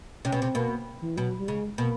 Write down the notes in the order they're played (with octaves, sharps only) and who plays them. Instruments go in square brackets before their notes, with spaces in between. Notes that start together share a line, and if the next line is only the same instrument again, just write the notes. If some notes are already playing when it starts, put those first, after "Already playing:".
[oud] C3 [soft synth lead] C#4
[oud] B2
[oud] C3 [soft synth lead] C4
[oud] B2 [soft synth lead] A#3
[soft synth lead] E3
[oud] B2 [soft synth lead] F#3
[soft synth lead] G3
[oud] C#3 [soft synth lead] G#3
[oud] B2 [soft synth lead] A#3